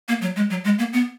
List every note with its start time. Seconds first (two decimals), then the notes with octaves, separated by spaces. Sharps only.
0.08 A#3
0.22 F#3
0.36 G#3
0.50 F#3
0.64 G#3
0.79 A#3
0.93 B3